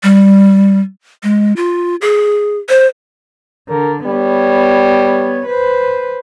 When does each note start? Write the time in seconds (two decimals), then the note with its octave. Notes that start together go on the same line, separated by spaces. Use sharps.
0.03 G3
1.23 G#3
1.57 F4
2.02 G#4
2.69 C5
3.69 D3 A#4
4.06 G3 B3 C#5
5.46 B4 C5